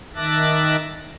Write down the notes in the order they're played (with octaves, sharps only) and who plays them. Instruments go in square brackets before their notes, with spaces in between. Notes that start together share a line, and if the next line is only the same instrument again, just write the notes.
[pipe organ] D#3 E5 A5 D6 F#6 A#6